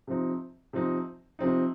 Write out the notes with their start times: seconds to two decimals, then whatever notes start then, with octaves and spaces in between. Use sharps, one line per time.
0.07 C3 F3 C4 D#4
0.73 C3 F3 C4 D#4
1.39 C3 F3 C4 D#4